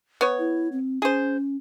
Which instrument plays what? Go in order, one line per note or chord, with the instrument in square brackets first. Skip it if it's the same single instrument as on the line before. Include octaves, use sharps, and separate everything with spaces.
[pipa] B3 C#5
[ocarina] E4
C4
[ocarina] C#4 [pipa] G#4 C5